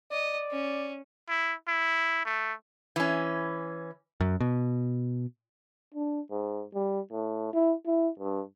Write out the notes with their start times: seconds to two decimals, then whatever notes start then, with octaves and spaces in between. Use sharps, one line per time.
0.11 D5 D#5
0.51 C#4
1.28 E4
1.68 E4
2.25 A3
2.96 E3 C#4
4.20 F#2
4.40 B2
5.94 D4
6.31 G#2
6.74 G3
7.12 A2
7.53 E4
7.87 E4
8.19 G2